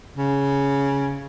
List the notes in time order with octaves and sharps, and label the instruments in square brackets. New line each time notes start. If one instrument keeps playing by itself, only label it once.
[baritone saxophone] C#3